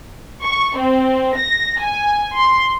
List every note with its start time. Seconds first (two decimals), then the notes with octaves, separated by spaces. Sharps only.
0.43 C#6
0.78 C4
1.37 A#6
1.82 G#5
2.39 C6